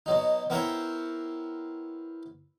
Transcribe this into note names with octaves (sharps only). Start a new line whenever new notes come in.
B2 F#3 D#4
B3 C4 E4 A#4 C5 C#5